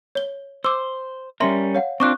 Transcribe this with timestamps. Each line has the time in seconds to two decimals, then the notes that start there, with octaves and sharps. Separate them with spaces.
0.15 C#5 G7
0.64 C5 D6 E6
1.40 G3 C#4 A#4 E5 C6 A#6
1.75 C#5 F5 F#5
2.00 C4 D4 F4 C#6 D6 F#6